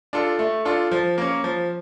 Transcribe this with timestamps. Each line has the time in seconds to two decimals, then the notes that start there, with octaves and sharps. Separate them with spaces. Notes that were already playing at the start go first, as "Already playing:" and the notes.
0.13 D4 F4 A4
0.39 A3
0.65 D4 F4 A4
0.91 F3
1.18 A#3 C#4
1.44 F3